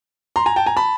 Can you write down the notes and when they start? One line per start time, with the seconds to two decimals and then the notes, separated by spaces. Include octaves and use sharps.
0.36 A#5 C6
0.46 G#5 A#5
0.56 G5 A5
0.66 G#5 A#5
0.77 A5 B5